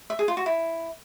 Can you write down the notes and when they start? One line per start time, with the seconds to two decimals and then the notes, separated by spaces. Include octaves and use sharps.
0.10 E5
0.19 G#4
0.28 F4
0.37 F#4
0.46 E4